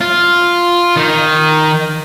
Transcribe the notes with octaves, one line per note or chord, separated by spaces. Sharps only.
F4
D#3